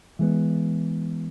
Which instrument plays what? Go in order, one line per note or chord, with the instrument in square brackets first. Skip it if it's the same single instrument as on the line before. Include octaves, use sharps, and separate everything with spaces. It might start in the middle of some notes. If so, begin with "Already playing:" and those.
[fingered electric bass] E3 G#3 B3